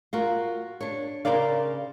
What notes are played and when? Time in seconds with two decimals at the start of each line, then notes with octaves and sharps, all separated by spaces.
0.13 F4 F#4 A#4
0.81 D4 C#5
1.25 C#3 A#4 C5 D5 F5